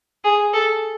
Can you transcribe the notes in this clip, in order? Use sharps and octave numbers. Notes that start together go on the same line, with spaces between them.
G#4
A4